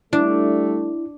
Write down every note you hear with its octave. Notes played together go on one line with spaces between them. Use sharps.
G3 A3 D4 E4